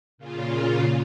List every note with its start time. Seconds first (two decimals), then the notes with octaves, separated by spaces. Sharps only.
0.18 A#2 C#3 F4